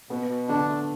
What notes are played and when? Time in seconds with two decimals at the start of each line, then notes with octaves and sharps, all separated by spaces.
0.09 B2 B3
0.29 B2
0.48 D3 D4
0.69 A3